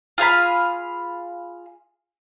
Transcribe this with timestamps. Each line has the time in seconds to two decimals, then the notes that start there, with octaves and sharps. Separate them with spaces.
0.18 F4 G#4 F5 B5